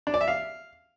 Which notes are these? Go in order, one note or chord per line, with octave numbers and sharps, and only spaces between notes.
D4
D5
E5
F5